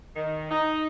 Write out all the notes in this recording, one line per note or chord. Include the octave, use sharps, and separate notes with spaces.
D#3
D#4